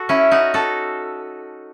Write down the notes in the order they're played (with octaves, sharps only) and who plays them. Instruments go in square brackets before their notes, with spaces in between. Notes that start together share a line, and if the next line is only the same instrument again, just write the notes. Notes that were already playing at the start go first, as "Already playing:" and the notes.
Already playing: [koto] F#4 A4
C#4 E4
D#4 F#4
F#4 A4